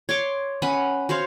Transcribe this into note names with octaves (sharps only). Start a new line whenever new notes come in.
C#5 C6 D6
C#4 B4 F#5
F#4 C5 C#5 F5